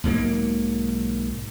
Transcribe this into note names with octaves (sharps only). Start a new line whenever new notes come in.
B1 G#2 F#3 A#3